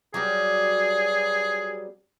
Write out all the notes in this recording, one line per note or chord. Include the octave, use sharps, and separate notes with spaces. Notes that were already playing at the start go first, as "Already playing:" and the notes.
F#3 G3 B3 G#4